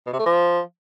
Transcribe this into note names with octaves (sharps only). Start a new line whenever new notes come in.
B2
C3
A3
F3